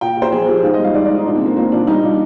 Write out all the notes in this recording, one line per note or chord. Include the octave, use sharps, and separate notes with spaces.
A#2 G5
A#2
C5
F3 G#4
F3 G4
G#2 F4
D#5
G3
F5
G#2 D5
D5
G#2 D#4
A#2 D4
C4
A#2 A#3
A#2 A#3
A#2 D4
G3 D#4
A#2 D4